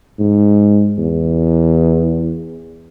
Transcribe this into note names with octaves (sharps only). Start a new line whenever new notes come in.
G#2
E2